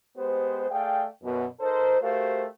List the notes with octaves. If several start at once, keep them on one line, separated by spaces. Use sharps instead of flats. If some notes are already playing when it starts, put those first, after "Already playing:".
G#3 B3 G4 C5
A3 G#4 D5 F5 G5
F#2 B2
D#4 A4 A#4 C5
A3 F#4 G4 A#4 C5 F5